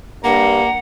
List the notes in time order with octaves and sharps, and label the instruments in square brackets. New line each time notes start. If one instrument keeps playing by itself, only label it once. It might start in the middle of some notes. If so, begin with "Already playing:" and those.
[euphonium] G2 [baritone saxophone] A#3 [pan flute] F#5 [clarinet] A#5